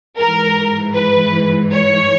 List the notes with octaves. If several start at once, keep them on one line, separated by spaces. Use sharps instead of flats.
G#2 E3 A#4
B4
C#5